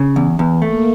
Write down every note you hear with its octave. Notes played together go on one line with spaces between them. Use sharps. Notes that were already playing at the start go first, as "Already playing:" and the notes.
Already playing: C#3
E2
E2
A3 A#3